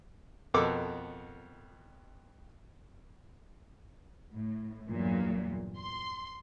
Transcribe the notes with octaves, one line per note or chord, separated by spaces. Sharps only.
F2 B2 A4 A#4 D6 E6
A2
E2 G2 A#2 F#3
C6